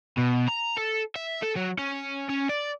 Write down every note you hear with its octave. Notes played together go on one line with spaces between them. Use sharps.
B2
A#5
A4
E5
A4
F#3
C#4
C#4
D5